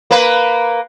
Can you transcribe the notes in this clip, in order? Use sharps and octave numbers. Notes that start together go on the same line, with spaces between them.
A#3 B4